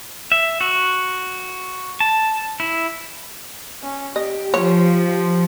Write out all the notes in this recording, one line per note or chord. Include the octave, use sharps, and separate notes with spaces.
E5
F#4
A5
E4
C#4
G4 D#5
F3 C#5
G4